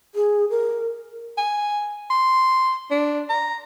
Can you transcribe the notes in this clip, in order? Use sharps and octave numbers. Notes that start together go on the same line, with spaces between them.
G#4
A#4
G#5
C6
D4
A#5